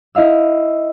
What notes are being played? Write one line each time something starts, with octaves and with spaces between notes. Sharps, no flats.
E4 D#5 F5 E6